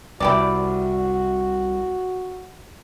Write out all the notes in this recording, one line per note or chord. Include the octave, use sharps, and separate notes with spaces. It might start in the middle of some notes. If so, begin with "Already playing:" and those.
C2 E4 F#4 G4 D5